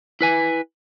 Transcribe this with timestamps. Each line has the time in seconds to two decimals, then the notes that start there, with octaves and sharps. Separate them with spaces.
0.21 E4 B4 G#5